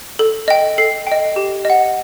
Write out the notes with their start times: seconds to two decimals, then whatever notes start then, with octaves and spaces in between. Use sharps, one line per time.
0.19 A4
0.48 D#5 G5
0.78 A4 C7
1.07 D#5 G5
1.36 G4
1.65 D#5 F#5